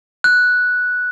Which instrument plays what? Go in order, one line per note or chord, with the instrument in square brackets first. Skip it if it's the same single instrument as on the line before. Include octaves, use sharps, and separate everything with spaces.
[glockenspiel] F#6